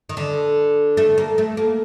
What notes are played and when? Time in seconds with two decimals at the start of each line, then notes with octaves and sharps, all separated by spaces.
0.09 D#3
0.17 D3
0.97 A3
1.18 A#3
1.38 A3
1.57 A#3